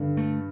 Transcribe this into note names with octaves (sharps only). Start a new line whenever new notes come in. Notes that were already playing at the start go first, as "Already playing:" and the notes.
Already playing: G2 D3
A3